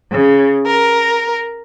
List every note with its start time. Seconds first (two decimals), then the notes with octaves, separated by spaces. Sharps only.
0.11 C#3
0.67 A#4